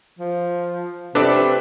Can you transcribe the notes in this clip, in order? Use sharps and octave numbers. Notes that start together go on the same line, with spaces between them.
F3
C3 D4 A4 B4 D5